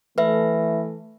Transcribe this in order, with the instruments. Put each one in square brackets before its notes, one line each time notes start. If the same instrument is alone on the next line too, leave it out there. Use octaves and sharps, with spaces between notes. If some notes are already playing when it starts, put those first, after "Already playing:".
[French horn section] E3 A3 [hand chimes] B4 E5